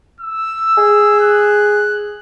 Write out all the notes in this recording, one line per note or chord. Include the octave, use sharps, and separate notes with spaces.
E6
G#4
F#6